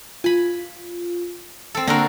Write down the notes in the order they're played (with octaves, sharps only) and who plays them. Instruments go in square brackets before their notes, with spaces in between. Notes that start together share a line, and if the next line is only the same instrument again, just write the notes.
[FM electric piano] F4 [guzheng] G#5 B5
[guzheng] C4 A4
[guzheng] D3 F#4 A#4 [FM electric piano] A#3